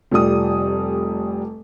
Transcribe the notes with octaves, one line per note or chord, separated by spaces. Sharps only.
F1 F3 G3 D#6